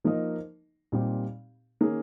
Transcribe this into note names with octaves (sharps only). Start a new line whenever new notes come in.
F3 A#3 D#4 A#4 D#5
A#2 G3 C4 D#4 G4
D#3 A#3 C#4 G#4